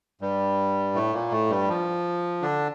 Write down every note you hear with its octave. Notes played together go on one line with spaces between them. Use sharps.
G2 G3
A2 A3
A#2 A#3
A2 A3
G2 G3
F3
D3 D4